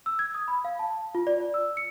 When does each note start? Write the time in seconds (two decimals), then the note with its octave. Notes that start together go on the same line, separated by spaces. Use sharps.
0.06 E6
0.19 G#6
0.34 D#6
0.48 B5
0.65 F5
0.79 A5
1.15 F4
1.27 D5
1.54 E6
1.77 C#7